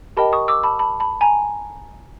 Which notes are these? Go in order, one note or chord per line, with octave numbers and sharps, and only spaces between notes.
G4 A#4 D#5 G5 A5 B5
C#6 D#6
D6 E6
A5 B5
A5 B5
A5 B5
G#5 A#5